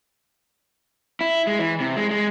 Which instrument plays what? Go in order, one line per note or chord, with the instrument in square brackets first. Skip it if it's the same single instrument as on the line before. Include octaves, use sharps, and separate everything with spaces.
[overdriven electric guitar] E4
G#3
E3
C3
G#3
G#3